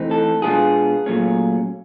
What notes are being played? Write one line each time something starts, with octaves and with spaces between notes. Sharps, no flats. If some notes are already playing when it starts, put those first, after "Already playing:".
Already playing: E3 A3 C4 D#4
A4
B2 G#3 B3 D4 F4 G#4
A#2 F#3 A3 C#4 F4